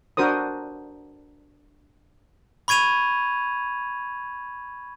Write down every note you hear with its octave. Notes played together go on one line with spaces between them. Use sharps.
D4 F#4 A#4 C5 D#6
B5 C#6 G#6 D#7 F7